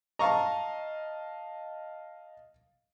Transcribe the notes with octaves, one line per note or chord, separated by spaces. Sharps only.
D#5 F5 A5 A#5 C#6